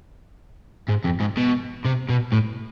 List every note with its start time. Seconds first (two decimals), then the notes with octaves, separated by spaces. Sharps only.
0.89 G#2
1.04 F2
1.20 G#2
1.37 B2
1.85 C3
2.09 B2
2.32 A2